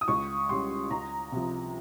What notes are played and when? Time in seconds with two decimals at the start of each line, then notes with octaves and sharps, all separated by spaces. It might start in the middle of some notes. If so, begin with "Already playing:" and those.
0.01 D#6
0.08 C#2 C#6
0.49 C#3 G3 C6
0.91 C#2 A#5
1.32 C3 F3